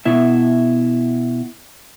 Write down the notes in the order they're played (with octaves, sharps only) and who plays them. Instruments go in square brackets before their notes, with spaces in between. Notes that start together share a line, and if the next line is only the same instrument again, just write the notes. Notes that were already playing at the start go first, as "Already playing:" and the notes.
[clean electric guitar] B2 E4 E5